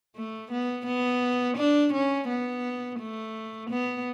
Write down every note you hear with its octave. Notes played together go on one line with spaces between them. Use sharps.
A3
B3
B3
D4
C#4
B3
A3
B3